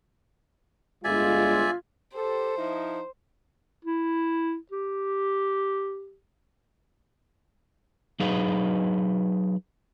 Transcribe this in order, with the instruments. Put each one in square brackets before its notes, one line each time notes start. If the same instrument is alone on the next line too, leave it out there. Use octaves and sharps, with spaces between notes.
[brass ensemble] G1 G#3 [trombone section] F4 [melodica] D5 E5 G#5
[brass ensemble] G4 A4 [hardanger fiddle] C5
[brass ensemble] F3 D#4 E4
[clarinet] E4
G4
[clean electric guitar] F#3 D#4 G#4 B4 D#5 F5